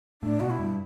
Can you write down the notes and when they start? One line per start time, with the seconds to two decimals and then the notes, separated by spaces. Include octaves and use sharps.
0.22 A2 D4
0.40 B2 F#4
0.50 E4
0.59 G2